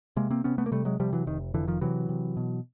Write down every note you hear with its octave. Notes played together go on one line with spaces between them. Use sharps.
C3 G#3 A#3
A#3 C4
C3 B3 C#4
A3 B3
A#3
C3 G3 A3
F#3 G#3
C3 F3 G3
E3 F#3
F1 D#3
F2 D3 E3
D#3 F3
C3 E3 F#3
C3
B2